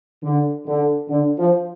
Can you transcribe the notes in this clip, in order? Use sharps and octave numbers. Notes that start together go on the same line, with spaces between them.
D3
D3
D3
F3